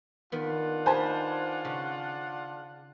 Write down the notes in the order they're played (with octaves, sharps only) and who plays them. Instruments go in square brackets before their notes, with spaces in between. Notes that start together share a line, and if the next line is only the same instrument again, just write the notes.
[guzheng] D#3 B3 [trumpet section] D4 F4 F#5
[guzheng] D#4 B4 [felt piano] C5 G#5 A5
[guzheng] C#3